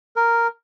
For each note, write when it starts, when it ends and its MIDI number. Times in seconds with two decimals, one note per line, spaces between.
0.16 0.47 70